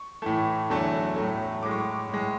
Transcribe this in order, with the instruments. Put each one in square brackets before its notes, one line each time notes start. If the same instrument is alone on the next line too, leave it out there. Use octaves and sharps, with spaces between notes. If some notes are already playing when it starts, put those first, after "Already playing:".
Already playing: [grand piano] C#6
A2 E3 A3
E2 D3 F#3 A3
A2 F#3 A3
A2 G#3 D6
C#6
D6
A2 G#3